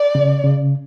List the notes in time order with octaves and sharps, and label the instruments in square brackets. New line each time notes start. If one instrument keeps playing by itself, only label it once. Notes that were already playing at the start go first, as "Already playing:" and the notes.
Already playing: [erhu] D5
[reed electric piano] C#3
C#3